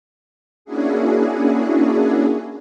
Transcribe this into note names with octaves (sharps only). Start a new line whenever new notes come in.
A#3 C#4 D4 E4 F#4 G#4